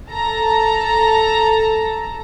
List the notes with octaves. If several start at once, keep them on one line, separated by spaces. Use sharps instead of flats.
A4 A5 A#5